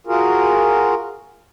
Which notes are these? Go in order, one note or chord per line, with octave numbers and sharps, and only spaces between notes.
F4 F#4 G#4 A#4